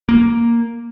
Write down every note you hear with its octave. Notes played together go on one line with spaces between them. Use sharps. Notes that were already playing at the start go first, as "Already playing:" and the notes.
A#3